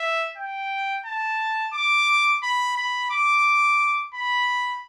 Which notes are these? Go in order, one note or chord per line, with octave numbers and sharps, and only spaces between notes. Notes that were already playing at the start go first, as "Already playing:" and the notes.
Already playing: E5
G5
A5
D6
B5
B5
D6
B5